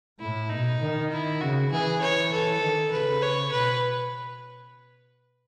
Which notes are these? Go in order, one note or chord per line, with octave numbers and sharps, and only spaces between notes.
A2 E4
B2 D#4
D#3
E4
C#3 F#4
E3 G#4
C#5
A4
D#3
C#3 B4
C#5
B2 B4